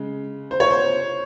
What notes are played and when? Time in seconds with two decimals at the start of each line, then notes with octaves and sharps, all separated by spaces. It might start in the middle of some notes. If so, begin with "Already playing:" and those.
Already playing: C#3 G#3
0.51 C5
0.60 C#5
0.71 C5